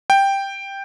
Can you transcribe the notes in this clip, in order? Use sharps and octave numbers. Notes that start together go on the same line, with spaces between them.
G5